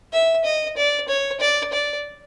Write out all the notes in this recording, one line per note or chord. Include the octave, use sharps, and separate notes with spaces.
E5
D#5
D5
C#5
D5
D5